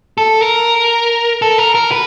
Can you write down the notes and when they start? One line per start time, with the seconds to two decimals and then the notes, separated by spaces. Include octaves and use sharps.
0.18 A4
0.42 A#4
1.42 A4
1.58 A#4
1.75 A#4
1.91 B4